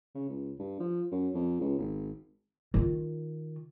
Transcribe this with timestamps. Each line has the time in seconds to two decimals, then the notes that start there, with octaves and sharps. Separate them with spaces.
0.15 C#3
0.29 C#2
0.59 G2
0.80 F3
1.12 F#2
1.34 F2
1.61 C#2
1.78 G#1
2.74 D#3 F4